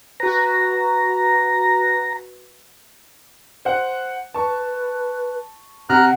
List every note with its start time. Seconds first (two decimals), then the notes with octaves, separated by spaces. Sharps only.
0.20 F#4 B4 A#5
3.65 C5 F#5
4.34 B4 A5 C#6
5.89 C3 F#5 A#5 F6 F#6